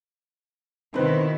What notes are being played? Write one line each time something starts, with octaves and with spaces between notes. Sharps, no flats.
B2 D#3 C4 E4 B4